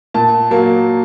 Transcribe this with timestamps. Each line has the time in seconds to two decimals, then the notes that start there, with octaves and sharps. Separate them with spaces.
0.14 A#2 A5
0.51 F#3 A#3